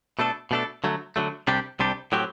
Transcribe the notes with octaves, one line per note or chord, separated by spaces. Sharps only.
B2 A3 D4 A4
B2 A3 D4 A4
D3 F#3 A3
D3 F#3 A3
C2 C3 G3 D4 G4
C2 C3 G3 D4 G4
A2 F#3 C4 G4